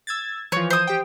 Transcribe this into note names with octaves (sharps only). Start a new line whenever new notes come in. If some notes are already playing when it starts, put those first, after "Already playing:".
E6 G#6 A6
E3 F3 C#5
C5 D#6
G4 G5